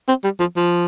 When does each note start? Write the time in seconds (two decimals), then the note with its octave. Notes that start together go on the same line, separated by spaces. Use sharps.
0.08 C4
0.24 G3
0.40 F3
0.56 F3